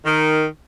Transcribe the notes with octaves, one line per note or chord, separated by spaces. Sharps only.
D#3